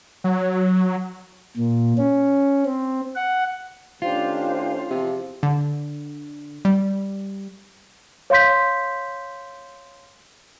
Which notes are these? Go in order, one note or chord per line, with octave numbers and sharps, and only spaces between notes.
F#3
A#2
C#4
C4
F#5
D#3 A3 C#4 D4 F4 G4 C5
E2 C3 F3
D3
G3
C#5 F5 C6 G6 B6